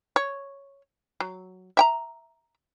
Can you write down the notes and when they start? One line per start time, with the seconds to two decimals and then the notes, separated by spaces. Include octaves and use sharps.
0.16 C#5
1.20 F#3
1.77 E5 G5 A#5